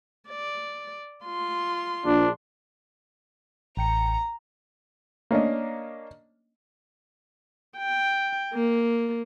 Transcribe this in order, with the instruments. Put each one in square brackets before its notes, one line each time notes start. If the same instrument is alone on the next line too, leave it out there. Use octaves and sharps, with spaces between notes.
[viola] D5
F4 C6
[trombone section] A#1 [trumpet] D4
[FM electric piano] A1 G5 C#7 [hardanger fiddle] A#5
[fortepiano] A#3 C#4 D4 D#5
[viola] G5
A#3